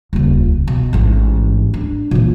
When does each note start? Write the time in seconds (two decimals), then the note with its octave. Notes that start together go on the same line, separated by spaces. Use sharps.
0.13 D#1 C#2
0.68 B2
0.93 A1 G#2
1.74 D4
2.11 A#2 E3